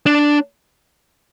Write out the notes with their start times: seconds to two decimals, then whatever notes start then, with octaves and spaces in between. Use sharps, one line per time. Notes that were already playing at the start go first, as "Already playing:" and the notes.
0.06 D4